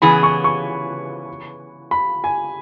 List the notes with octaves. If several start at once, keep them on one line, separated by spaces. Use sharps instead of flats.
C#3 E3 B3 G#4 B5
C#6
C#6
B5
G#5